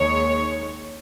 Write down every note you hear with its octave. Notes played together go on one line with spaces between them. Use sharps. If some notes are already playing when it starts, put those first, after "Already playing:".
Already playing: D#2 D#3 G#3 C#5